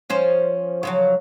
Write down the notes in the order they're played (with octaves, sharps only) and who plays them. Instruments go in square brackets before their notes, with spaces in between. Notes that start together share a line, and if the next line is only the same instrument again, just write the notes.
[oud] F3 C#4 C5
C#3 F3 F#3